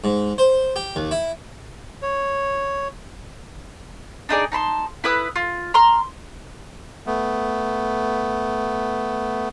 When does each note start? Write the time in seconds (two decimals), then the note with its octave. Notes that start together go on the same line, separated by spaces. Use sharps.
0.04 G#2
0.38 C5
0.76 G4
0.96 D#2
1.11 E4
2.02 C#5
4.29 D4 D#4 G#4 D5
4.52 D#4 A5 B5 C6
5.04 E4 B4 D#6
5.36 F4
5.74 A#5 C6 F6
7.07 A3 B3